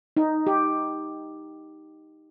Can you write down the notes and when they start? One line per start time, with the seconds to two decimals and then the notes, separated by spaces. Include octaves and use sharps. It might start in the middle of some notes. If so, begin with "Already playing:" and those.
0.17 D#4
0.47 G4